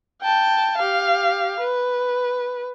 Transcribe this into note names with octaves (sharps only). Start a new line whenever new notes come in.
G5 A5
G4 F5
B4